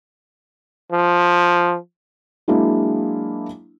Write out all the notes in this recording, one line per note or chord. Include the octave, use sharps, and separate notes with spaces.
F3
F#3 G#3 A#3 D4 E4